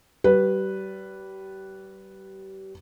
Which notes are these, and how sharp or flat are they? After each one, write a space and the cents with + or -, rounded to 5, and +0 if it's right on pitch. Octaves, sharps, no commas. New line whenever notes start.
G3 -30 B4 -5